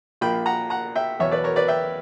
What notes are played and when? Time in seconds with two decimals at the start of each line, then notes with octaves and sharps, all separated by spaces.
0.21 A#1 A#2 A#3 G5 B5
0.46 F#5 A#5
0.70 F#5 A#5
0.95 E5 G5
1.19 E2 B2 F#3 B3 C#5 E5
1.31 B4 D5
1.44 A#4 C#5
1.56 B4 D5
1.68 E5 G5